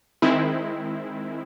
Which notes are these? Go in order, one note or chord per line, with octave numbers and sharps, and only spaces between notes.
D#3 G#3 C4 E4